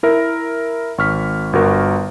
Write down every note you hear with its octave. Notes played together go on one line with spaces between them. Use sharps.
E4 A#4 E5
G#1 C#6 F6 B6
G1 F#4 A#4